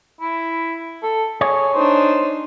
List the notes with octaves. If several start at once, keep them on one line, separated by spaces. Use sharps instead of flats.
E4
A4
G#4 C#5
D4 D#4 C5